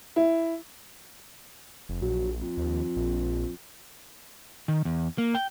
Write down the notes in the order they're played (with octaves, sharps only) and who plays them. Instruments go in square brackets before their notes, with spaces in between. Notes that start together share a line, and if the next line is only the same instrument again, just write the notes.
[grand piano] E4
[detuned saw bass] F1
[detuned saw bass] A#1 [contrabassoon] F#3
[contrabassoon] F2
[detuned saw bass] D#2
A#1
[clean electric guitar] D#3
E2
A#3
G5